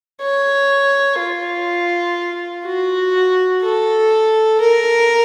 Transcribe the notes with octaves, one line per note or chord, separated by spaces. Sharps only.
C#5
F4
F#4
A4
A#4